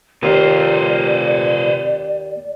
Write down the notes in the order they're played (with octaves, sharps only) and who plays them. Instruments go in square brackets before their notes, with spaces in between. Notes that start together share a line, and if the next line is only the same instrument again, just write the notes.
[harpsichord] D#2 [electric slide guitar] C3 F4 [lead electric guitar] B4 C5 [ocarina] D5